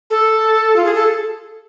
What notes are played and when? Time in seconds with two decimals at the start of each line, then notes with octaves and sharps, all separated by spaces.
0.10 A4
0.76 F4
0.85 G#4
0.95 A4